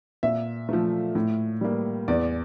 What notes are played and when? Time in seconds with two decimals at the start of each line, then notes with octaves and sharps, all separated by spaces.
0.23 A#2 E5
0.69 F3 A3
1.15 A2
1.61 G3 A#3
2.08 E2 D5